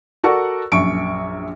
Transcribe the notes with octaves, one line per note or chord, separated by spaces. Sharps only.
F#4 A4 A#4 D5 F#5 C#6
A#1 F#2 E5 C#6 D7